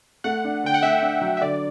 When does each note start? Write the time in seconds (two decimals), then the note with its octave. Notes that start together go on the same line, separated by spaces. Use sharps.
0.24 A3 F#5
0.44 D4
0.64 D3 G5
0.74 F#5
0.82 A3 E5
1.02 D4
1.21 F#3
1.37 E5
1.42 D3 D5